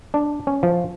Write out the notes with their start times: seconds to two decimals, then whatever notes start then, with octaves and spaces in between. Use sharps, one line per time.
0.14 D4
0.47 C#4
0.63 F3